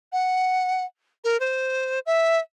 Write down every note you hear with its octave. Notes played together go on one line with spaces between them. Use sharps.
F#5
A#4
C5
E5